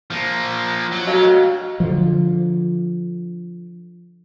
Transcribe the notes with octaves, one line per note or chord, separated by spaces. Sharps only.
F3 A#3
F#3
F#4 D#5 F5
D3 F3